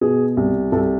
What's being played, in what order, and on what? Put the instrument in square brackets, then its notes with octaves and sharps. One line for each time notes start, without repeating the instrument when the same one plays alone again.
[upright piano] B2 G#4
C2
C2 A4